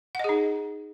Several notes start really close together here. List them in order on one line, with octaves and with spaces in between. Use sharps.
F#5 D#5 G#4 D#4